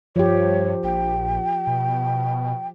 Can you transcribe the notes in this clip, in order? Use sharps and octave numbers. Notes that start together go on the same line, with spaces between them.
G2 F3 G4 C#5
A#1 G5
B2